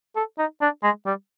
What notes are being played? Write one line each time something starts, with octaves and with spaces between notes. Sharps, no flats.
A4
D#4
D4
G#3
G3